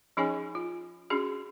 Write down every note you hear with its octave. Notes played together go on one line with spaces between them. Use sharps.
F3 C#4 D#4 G#4 C#5 G#5
F4
C#4 D4 F#4 G#4